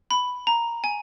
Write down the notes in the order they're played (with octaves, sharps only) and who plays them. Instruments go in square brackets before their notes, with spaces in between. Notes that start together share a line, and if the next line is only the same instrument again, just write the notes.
[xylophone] B5
A#5
G#5